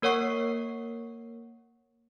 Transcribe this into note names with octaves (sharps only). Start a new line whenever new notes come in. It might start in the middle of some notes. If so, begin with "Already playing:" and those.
A#3 A#4 C#5 F#5 C#6 C7